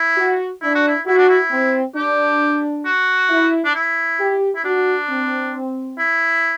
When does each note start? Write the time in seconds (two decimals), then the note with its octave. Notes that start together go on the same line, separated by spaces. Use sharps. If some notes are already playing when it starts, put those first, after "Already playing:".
Already playing: E4
0.17 F#4
0.62 D4 E4
0.75 F#4
0.88 E4
1.06 E4 F#4
1.18 D4
1.29 E4
1.51 C4
1.96 D4 G4
2.86 F#4
3.30 E4
3.65 D4
3.75 E4
4.20 G4
4.55 E4
4.64 D4 F#4
5.09 C4
5.98 E4